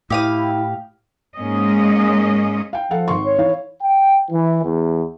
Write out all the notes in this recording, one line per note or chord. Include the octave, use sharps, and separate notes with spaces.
A2 E4 G4 F5 D#6
G#2 G#3 A#3 C#4 D#5
F5 G5
F3 A4 F5 F#5
G#1 C6 C#6
C#5
E3 E4 F5
G5
E3
E2